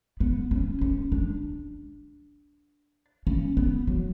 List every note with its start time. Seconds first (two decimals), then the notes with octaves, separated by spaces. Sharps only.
0.20 B3
0.51 C#4
0.81 C#4
1.12 D4
3.27 C#4
3.57 B3
3.87 F#3